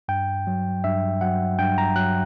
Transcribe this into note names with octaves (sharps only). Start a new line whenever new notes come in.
G2 G5
F#3
G2 E5
F#3 F#5
G2 G5
A#5
F#3 F#6